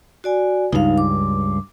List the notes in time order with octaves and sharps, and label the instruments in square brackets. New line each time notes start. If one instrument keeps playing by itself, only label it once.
[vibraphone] F#4 D5 G#5
[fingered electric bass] C#2 G2 [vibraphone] D#4 F5
[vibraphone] D6